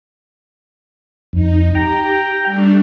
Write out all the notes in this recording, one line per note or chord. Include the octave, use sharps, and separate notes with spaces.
F2 D#4
G4 G5 A#5
G3 A3 D4